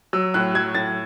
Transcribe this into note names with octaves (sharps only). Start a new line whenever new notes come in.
F#3 E6
A2 F#6
F#3 G#6
A2 A6